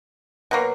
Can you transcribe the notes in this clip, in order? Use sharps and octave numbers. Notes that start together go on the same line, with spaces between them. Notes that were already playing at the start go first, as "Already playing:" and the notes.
B2 F#3 A#3